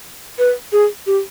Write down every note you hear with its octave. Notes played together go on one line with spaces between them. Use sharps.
B4
G#4
G4